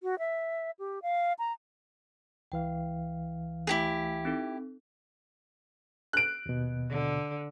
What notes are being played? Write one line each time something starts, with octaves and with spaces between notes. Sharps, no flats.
F#4
E5
G4
F5
A#5
C#2 E3 F5 G5
A3 E4 G4 G#4 G#5 A#6
C4 D#4 A4
F#6 D7
D#2 B2
D3